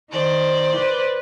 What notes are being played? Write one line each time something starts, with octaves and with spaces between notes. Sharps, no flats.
D#3 C5 D5
B4